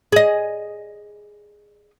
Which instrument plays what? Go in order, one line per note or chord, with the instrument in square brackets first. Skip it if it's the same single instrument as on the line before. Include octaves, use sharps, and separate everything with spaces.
[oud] G#4 D#5